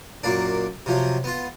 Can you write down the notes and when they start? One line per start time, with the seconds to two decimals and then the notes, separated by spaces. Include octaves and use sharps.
0.24 F#2 A#2 A#3 D4
0.86 C3 F3 F#3
1.24 B3 F4